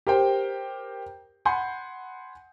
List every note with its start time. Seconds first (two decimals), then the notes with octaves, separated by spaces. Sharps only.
0.07 G4 A#4 C5 G5
1.45 F#5 G#5 B5 C6 G6